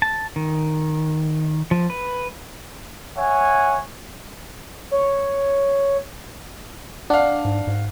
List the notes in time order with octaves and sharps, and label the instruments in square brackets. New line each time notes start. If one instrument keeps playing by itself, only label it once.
[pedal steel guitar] A5
D#3
F3
B4
[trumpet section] C#5 E5 F#5 G#5
[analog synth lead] C#5
[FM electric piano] D4 [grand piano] F5 F#5
[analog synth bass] G#2
G#2